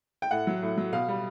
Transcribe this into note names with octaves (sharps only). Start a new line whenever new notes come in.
G5
A2 F#5
F#3
A2
F#3
B2 F5
G3